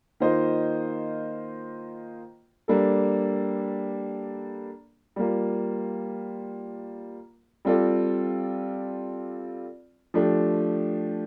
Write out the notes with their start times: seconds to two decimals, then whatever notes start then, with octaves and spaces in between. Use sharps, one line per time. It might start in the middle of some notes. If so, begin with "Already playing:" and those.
0.20 D#3 A#3 F4 C5 D#5
2.68 G3 A#3 D4 A4
5.16 G3 A#3 F4
7.65 G3 C4 F4 A4 D5
10.14 F3 A3 D4 G4